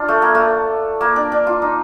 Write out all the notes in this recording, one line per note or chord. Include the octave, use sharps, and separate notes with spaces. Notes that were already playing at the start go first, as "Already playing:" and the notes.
Already playing: D4 F4
A3
A#3
A3
A#3
D4
D4
F4
D#4